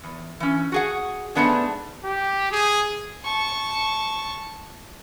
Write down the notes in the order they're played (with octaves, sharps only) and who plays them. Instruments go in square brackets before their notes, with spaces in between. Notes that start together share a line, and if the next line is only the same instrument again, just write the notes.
[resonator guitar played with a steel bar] E2
E3 C#4
F#4 G#4 F#5
G#2 F#3 A3 B3 D4 G#4
[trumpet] G4
G#4
[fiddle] A5 C#6